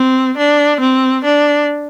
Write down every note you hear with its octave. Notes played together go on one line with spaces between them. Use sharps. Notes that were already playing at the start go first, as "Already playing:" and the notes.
Already playing: C4
D4
C4
D4